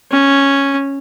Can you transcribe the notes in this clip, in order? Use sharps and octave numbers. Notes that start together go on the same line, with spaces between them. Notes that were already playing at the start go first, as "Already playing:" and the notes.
C#4